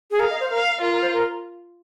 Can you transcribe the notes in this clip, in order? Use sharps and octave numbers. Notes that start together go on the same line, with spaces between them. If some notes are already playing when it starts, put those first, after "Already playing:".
G#4
A#4 F5
D#5
C5
A#4 F5
F4 A#4
A#4
C5
A#4